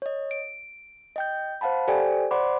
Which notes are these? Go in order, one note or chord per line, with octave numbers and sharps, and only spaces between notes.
C#5 D#5
D7
D#5 G5 G6
C5 F5 F#5 A5 B5
G4 A4 C5 D5 G5 G#5
C5 D5 F#5 B5 C6 D6